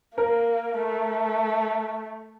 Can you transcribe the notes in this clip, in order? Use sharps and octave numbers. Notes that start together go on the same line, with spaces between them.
A#3 A#4
A3